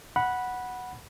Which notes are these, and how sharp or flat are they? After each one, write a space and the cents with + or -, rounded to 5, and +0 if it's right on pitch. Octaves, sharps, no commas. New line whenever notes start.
F#5 +0 B5 -10